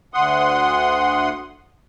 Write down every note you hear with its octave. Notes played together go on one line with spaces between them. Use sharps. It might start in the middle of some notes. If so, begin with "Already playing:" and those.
D2 F#5 C6 D#6